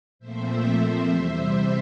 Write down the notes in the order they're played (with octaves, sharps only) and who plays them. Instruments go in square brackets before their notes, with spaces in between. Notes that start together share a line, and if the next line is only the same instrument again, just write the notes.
[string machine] A#2 F3 A3 C4 C5 E5
E2 C3 G3